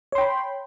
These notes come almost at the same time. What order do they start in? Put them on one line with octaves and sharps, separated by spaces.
C#5 C6 G5 B5